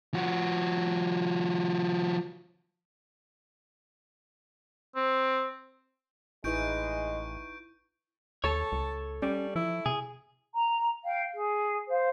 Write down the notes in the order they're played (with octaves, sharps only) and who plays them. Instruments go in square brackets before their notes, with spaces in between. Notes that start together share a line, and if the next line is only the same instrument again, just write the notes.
[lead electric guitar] F3 F#4
[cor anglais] C4
[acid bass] A1 [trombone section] G#3 [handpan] D#4 E4 B4 [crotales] C#6 G6 D7
[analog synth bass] D#2 [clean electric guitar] A4 C#5 [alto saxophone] A5
[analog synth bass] C#2
[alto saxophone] G3 [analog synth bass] C#4
[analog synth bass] F3 [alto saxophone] E4
[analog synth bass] C3 [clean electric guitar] G#4
[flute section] A#5
F5 G5
G#4
C5 F5